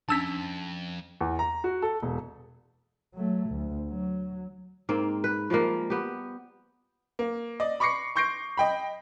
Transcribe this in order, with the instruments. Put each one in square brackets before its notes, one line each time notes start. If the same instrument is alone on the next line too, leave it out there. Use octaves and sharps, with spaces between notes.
[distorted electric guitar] F2 [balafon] C#4 D4 [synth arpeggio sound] A5 E6 B6
[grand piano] E2
A#5
F#4
A4
E1
[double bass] F#3 A3
D2
F#3
[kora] G#2 A#3 C4
B4
F3 G3 G#3 A#3
B3 G4
[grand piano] A#3
D5 D#5
B5 C#6 D6 A#6 C7 C#7
C6 C#6 G6 A#6 C7 D7
D#5 G5 B5